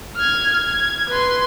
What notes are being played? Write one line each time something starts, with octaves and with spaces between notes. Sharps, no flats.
F6 G#6
G#6
B4 C6